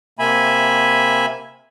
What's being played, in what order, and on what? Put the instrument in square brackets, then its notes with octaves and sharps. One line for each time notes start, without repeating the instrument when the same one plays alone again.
[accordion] C3 A#3 E5 G#5 B5